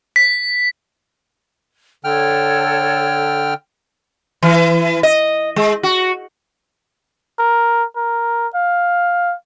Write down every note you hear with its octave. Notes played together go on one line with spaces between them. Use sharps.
B6
D3 A4 C#5 G5 F6
E3
D#5
G#3
F#4
A#4
A#4
F5